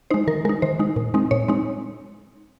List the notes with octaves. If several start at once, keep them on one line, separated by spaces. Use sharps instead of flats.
G#3 D#4 C5
D#3 A#4
G#3 D#4 A#4
D#3 C5
G#3 D#4
A#2
G#3 C4 D#4
A#2 C#5
G#3 C4 D#4